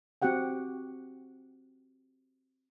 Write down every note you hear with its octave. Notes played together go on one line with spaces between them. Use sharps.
C4 F#4 G4 F#5 G5